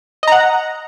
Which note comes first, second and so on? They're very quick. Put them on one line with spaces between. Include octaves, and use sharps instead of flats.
D#5 A#5 F#5